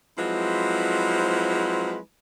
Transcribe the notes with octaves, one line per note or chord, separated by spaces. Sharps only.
F3 F#3 G#3 C4 E4 B4